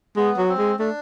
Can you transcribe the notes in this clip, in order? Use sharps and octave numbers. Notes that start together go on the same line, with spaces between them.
G#3 B3
F#3
C4
G#3
A3 D4